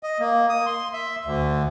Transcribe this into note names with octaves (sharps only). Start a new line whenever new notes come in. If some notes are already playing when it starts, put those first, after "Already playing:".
D#5
A#3
D#6
C6
E5
D2